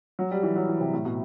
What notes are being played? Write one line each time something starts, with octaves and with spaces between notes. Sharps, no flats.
F#3
G3
E3
F#3
E3
C3
A2
B2